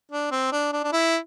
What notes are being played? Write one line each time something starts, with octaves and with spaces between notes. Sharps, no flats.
D4
C4
D4
D4
D4
E4